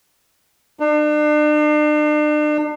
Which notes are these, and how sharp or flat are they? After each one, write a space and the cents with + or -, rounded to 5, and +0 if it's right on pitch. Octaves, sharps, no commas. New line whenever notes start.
D4 +40